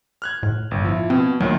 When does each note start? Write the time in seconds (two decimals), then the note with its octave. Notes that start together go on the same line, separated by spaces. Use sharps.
0.22 F6 F#6 G#6
0.43 A2
0.71 G1
0.84 F3 E4
1.10 B2 C4
1.40 D2 A#2 D#3 F#3